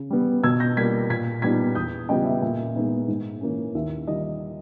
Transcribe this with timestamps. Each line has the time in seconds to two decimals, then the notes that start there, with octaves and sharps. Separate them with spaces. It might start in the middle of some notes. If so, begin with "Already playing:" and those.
Already playing: C#3
0.10 G3 B3
0.43 B2 E6 G#6
0.60 G6 A#6
0.77 G3 A#3 G#6 B6
1.10 A#2 G#6 B6
1.42 G3 B3 D#4 G#6 B6
1.75 E2 D#6 G6
2.09 C#3 G3 B3 D#5 G5
2.25 E5
2.42 A#2 E5
2.76 G#3 B3 D#4
3.08 G#2
3.41 E3 A#3 C#4
3.75 D#2 E5
4.07 D#3 G3 D#5